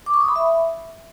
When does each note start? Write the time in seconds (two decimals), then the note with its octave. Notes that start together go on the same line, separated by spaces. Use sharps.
0.06 D6
0.14 C#6
0.21 D#6
0.28 B5
0.36 E5